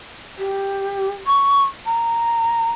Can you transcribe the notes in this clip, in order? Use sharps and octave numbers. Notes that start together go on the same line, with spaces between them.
G4
C#6
A#5